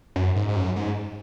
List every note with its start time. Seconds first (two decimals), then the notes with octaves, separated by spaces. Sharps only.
0.16 F#2
0.36 G#2
0.48 G#2
0.56 F#2
0.76 G#2